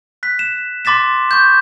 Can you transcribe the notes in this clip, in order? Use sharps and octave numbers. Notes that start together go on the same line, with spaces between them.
F#6 B6
E7
C6 D6 A6 B6 E7
C#6 G6